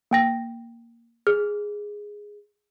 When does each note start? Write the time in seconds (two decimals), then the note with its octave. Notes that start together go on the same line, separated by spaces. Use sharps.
0.11 A#3 G5 A#6
1.27 G#4 F6